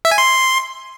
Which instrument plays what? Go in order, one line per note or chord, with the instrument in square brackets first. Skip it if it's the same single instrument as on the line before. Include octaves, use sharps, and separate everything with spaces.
[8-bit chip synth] E5
G#5
C6